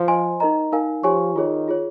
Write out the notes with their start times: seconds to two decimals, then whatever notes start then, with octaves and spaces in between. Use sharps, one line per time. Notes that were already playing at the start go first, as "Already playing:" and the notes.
Already playing: F3
0.08 C5 D#5 G#5 C6
0.40 D#4 A#4 D#5 A#5
0.72 D#4 A#4 F5 G#5
1.03 F3 G4 C#5 G#5 C#6
1.35 D#3 F4 G#4 C#5
1.68 F4 G#4 C#5